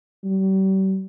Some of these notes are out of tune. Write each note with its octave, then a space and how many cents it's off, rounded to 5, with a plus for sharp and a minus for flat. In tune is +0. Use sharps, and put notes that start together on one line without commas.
G3 -40